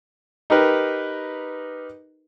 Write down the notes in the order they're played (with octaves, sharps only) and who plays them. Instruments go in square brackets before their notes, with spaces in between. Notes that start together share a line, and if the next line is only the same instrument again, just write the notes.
[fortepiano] D#4 G4 A#4 B4